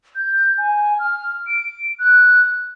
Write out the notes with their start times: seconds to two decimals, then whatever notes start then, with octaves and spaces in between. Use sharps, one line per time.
0.16 G6
0.58 G#5
0.99 F6
1.47 D7
2.00 F#6